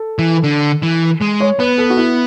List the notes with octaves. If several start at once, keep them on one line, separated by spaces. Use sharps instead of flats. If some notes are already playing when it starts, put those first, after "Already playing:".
Already playing: A4
E3
D3
E3
G#3
C#5
B3 B4
A4
F#4
E4